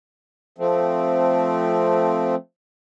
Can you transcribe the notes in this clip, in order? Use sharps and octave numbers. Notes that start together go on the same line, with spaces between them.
F3 A3 C4